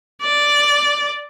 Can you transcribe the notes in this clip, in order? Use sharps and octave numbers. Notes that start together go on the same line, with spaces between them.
D5